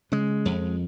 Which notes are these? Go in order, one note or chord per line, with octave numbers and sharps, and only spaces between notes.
C#3 G#3
F2